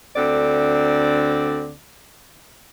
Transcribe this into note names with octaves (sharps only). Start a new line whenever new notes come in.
D2 D3 C4 D5